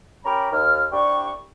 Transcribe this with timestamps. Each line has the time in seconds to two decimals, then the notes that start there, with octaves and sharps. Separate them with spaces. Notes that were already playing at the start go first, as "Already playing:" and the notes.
0.25 C#4 G4 A#4 A#5 B5
0.51 D#2 F6
0.92 C2 G3 D4 G4 C#6